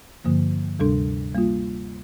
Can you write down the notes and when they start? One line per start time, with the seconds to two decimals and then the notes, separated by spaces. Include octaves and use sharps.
0.24 G2 D3 F3 A#3
0.79 D2 C3 G3 D4 A4
1.35 G3 A#3 F4